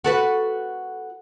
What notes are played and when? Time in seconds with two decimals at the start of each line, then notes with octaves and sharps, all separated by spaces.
0.04 F#4 A4 B4